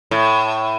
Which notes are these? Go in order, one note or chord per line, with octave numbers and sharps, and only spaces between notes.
A2